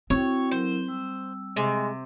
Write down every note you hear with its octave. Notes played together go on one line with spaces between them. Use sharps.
C4 E4 F#4 C#5 G5
F#3 E4 A#4 C5
G3 E6
C3 G#3